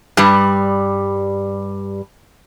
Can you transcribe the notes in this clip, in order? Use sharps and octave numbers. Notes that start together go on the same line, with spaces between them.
G2 G3